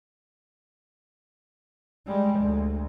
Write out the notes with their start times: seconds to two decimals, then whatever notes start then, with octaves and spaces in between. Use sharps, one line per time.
2.06 G3 G#3
2.39 D2